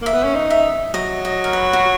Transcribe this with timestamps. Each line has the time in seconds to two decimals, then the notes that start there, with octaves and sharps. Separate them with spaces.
0.02 A#3 E5
0.13 B3
0.24 C#4
0.35 D#4
0.50 E5
0.94 F#3 D#5
1.25 D#5
1.44 A#4
1.53 B4
1.73 F#4